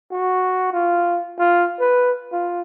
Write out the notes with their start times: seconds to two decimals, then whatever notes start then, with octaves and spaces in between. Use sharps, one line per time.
0.12 F#4
0.72 F4
1.38 F4
1.80 B4
2.32 F4